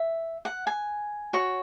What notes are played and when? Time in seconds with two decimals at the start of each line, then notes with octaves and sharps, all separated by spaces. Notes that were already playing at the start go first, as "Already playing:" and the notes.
Already playing: E5
0.45 F#5
0.67 G#5
1.33 F#4 C#5